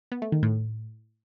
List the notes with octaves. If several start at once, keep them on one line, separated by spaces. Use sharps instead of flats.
B3
A3
D#3
A2